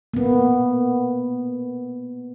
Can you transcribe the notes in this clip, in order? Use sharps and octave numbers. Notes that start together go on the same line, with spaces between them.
A#3 B3